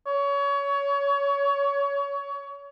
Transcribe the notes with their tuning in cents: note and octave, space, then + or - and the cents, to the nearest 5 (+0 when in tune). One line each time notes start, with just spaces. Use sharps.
C#5 +25